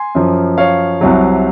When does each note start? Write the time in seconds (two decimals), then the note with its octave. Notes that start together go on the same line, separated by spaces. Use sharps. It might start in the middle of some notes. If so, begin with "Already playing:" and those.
Already playing: G#5 C6
0.15 F#2 F3
0.58 C#5 F5
1.01 C2 C3 F#3